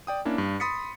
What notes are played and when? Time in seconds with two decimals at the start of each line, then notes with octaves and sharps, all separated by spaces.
0.07 D5 G5 D#6
0.25 A#3 C#4 D4 E4
0.38 G2
0.60 B5 C6 D#6 A6 B6 C#7